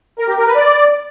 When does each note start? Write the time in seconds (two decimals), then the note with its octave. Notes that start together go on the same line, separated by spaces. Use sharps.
0.19 A#4
0.28 G4
0.37 A#4
0.46 B4
0.56 D5